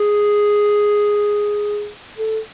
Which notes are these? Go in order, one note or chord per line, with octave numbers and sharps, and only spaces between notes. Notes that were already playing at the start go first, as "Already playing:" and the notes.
Already playing: G#4
A4